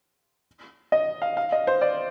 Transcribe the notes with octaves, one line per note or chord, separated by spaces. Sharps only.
D#5
F5
F5
D#5
C5
D5